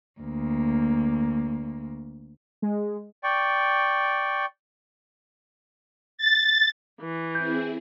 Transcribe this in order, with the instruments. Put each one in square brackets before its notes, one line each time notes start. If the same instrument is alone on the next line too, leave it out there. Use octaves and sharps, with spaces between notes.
[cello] D2 A#3
[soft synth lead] G#3
[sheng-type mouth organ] D5 G5 C#6
[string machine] A6
[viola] E3
[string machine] C4 E4 G#4 [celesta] G6